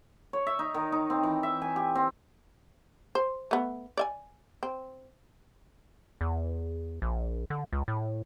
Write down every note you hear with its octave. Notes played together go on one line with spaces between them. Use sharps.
C#5
E5
D#4
D#3
D#4
C4
E3
E5
G#5
G4
C4
C5
A3 B3
D5 E5 G#5
C4
E2
A#1
D3
C#2
A2